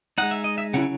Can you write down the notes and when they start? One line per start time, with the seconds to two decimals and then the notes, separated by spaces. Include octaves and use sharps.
0.18 G#3 D#4 F#5
0.31 E5
0.44 D#5
0.58 E5
0.73 C#3 F#3 C#4 E4 F#5